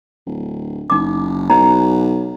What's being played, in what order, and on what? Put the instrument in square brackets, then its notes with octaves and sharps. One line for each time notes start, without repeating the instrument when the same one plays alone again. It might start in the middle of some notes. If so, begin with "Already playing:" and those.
[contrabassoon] D1
[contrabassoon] F#1 [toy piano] D#4 D6
[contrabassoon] B1 [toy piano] D#4 A#5